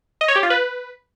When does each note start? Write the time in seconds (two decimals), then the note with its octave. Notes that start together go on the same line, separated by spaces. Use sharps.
0.21 D#5
0.28 C#5
0.36 G4
0.43 F4
0.50 B4